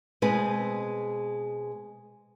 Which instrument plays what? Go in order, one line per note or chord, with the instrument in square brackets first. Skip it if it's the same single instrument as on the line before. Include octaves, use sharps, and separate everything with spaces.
[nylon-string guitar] B2 G#3 C4 G#4 B4